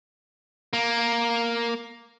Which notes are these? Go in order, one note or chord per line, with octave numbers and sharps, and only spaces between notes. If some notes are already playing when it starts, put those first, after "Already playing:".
A#3